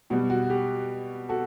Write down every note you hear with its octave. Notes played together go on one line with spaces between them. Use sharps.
B2 G3 F#4
F#4
G4
F#4 A4